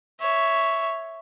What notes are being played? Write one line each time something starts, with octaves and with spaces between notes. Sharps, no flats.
C#5 E5